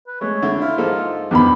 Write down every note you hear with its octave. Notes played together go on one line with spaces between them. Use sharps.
B4
G#3 A3 C#5
D3 E4
E4 F4
G#2 F3 A#3 A4
E2 G2 D3 D#3 G4 B5